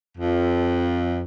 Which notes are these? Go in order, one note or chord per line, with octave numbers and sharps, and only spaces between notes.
F2